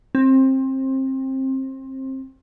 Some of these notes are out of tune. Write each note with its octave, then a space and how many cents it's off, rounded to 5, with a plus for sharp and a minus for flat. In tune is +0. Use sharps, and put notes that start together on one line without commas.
C4 +25